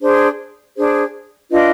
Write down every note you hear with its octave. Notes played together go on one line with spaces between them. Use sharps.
D4 G#4 C5
D4 G#4 C5
D4 F4 B4 D#5